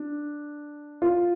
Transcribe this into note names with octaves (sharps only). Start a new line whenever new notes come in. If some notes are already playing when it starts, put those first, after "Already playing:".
Already playing: D4
F4